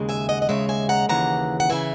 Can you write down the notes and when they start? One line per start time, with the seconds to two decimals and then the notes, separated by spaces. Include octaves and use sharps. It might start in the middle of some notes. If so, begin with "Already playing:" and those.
Already playing: D#2 C#3 G#3
0.09 E5 G#5
0.29 D#5 F#5
0.42 D#5
0.49 D#2 C#3 G#3 C#5 E5
0.69 E5 G#5
0.89 F#5 A#5
1.09 D#2 C#3 E3 F#5 A#5
1.60 F#5
1.70 C#3 E3 E5 G#5